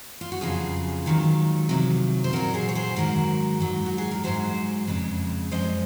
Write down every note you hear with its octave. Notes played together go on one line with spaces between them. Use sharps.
F4
F#4
F2 C#3 F#3 F4 G#4
G#2 D#3 F#3
C3 D#3 F#3
C5
A#2 F#3 F#4 A#4
G#4 C5
C#5
G#4 C5
G#2 D#3 F#3 F#4 A#4
G#2 F#3
F#4
G#4
A#4
G#2 D#3 F#3 G#4 C5
F2 C#3 G#3
F#2 F3 G#3 C5 D#5